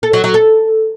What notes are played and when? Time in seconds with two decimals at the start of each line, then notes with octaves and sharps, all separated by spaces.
0.03 A4
0.13 F#3
0.24 F#3
0.34 A4